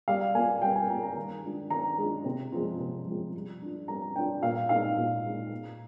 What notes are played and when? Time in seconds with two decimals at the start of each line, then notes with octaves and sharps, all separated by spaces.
0.08 G3 F5
0.35 A#3 G#5
0.38 F4
0.62 G3 G5
0.76 G#5
0.89 A#3 F4 A#5
1.03 A#5
1.16 D#3
1.44 G#3 D4 F4
1.70 D#3 A#5
1.98 G#3 D4 F4
2.25 C3
2.52 F3 G#3 C4 F4
2.79 C3
3.07 F3 G#3 C4 F4
3.34 G3
3.62 D4 F4
3.88 G3 A#5
4.15 D4 G5
4.19 F4
4.43 A#2 F5
4.69 G#3 D#4 F5
4.97 A#2
5.24 G#3 D#4
5.51 A#2